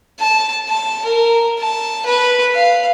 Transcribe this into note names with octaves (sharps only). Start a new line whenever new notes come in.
A5
A5
A#4
A5
B4
F5